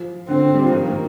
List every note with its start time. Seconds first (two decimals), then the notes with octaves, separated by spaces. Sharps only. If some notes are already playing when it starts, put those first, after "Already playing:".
Already playing: F3
0.28 D3 C4
0.54 G3
0.64 F3
0.72 D#3 A#3
0.88 D#3